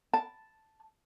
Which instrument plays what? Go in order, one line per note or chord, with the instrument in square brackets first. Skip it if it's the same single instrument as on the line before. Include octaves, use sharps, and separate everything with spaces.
[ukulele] A5